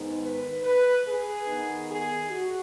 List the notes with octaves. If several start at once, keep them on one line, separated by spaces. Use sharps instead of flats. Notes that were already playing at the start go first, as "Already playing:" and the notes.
Already playing: G#2 D#3 B3 D#4
B4
B4
G#4
D#3 B3 D#4
G#4
F#4